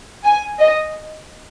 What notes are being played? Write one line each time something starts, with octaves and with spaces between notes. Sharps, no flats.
G#5
D#5